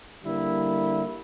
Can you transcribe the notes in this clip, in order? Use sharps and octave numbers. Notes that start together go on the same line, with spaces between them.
D3 G3 A#3 E4